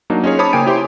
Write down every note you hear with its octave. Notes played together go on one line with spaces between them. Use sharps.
F#3 A#3 D4 D#4
C#4 D#4 F4 G#4 C#5
C5 C#5 A5 B5 D6 D#6
C#3 A#3 G5 G#5 D7
E4 G4 C5 G#5 C6